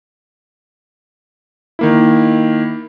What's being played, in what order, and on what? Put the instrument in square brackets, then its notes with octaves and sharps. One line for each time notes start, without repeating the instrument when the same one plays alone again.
[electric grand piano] D#3 A#3 E4